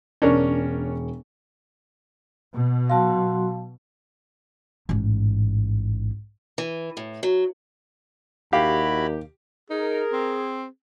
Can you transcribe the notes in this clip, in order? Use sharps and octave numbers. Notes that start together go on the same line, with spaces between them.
E1 C#4 D4 A#4 C#6
B2
F#3 F#4 F5 A5 C6
A1 G#2
E3
A2
F#3
D#2 E4 F#4 G4 F5 B5
D#4 G#4 A#4
C4